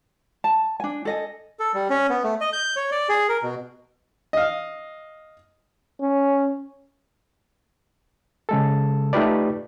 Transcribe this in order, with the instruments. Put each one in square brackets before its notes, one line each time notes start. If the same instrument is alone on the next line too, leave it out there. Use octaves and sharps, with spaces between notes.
[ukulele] A5
D4 G#5
A4 D#5 G#5
[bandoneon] A4
G3
C#4
B3
A3
D#5
G6
C#5
D5
G#4
A#4
B2
[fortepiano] D#5 F5
[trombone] C#4
[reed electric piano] C#3 G#3 A4
A3 D#4 F4 G4 B4 D5